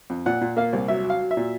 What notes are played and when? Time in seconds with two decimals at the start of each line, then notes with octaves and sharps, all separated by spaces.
0.10 F2
0.26 A#2 F#5
0.41 A#2
0.57 A#3 F5
0.73 C2
0.88 F#3 E5
1.04 F#3
1.10 F5
1.20 F#3
1.31 E5
1.37 A#2